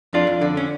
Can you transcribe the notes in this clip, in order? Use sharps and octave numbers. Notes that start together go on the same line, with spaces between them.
F2 D4 F4
F2
D3
C#4